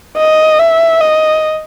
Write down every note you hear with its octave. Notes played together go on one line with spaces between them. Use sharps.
D#5
E5
D#5